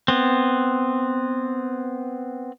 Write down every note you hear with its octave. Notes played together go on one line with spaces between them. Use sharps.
B3 C4